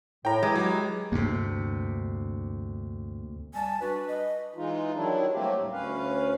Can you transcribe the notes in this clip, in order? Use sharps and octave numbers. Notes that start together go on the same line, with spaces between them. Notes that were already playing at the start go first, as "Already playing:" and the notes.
A2 G5 A#5
E3 G#3 E4 G4
F#3
D2 G2 C3 A#3
G3 G#5 A5
D4 F#4 B4
D#5
E3 G#3 D#4 F4
D#3 F#3 G3 D4 E4
F#3 G3 A3 A#3 C4 G4
D2 A2 G3
D2 C#4 B4 F5